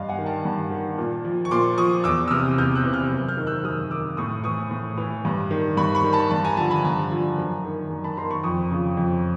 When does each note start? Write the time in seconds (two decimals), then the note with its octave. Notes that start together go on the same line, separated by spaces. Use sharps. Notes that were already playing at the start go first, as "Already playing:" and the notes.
Already playing: G2 D#5 F5
0.09 F#5 G#5
0.18 D#3
0.26 G5 A5
0.45 G2
0.71 D#3
0.98 A#2
1.25 F3
1.45 C#6
1.51 A#2 C6 D6
1.78 F3 C#6 D#6
2.04 E2 D6 E6
2.28 E6
2.31 C3 E3 D#6 F6
2.58 E2 F6 G6
2.75 E6 F#6
2.85 C3 E3
2.93 F6 G6
3.11 F#2
3.28 F6 G6
3.37 D#3
3.47 E6 F#6
3.64 F#2 D#6 F6
3.91 D#3 D6 E6
4.17 A2 C#6 D#6
4.44 E3 C#6 D#6
4.71 A2
4.97 E3
5.25 G2
5.51 D#3
5.77 G2 B5 C#6
5.95 B5 C#6
6.04 D#3
6.13 A5 B5
6.31 G2 A5 B5
6.44 G#5 A#5
6.57 D3 F3 A5 B5
6.71 A5 B5
6.84 G2 G#5 A#5
7.11 D3 F3
7.38 F#2
7.65 D#3
7.90 F#2
8.04 A5 B5
8.17 D#3 A#5 C6
8.31 B5 C#6
8.44 F2 C#6 D#6
8.71 C#3 F3
8.97 F2